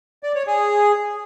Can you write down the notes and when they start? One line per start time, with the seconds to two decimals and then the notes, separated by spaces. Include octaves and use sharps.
0.23 D5
0.35 C#5
0.47 G#4